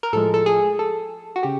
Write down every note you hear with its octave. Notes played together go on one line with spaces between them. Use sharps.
A#4
A2 F3 G#3 A4
A4
G#4
A4
F#4
C#3 G4